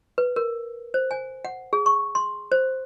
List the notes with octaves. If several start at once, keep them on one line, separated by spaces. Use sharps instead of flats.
B4
A#4
C5
G#5
F#5
G#4
C#6
C6
C5